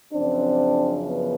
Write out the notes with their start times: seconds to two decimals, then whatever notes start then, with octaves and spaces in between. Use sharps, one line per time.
0.13 F#2 C#3 F3 C4 D4
1.07 B3